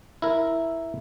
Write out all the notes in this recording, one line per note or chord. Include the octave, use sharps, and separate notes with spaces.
E4 A#4